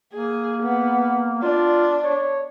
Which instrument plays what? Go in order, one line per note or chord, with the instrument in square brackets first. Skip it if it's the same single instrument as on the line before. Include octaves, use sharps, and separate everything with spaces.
[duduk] A#3 [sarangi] G#4
[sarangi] B3
[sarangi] D4 [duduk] F4
[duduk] C#5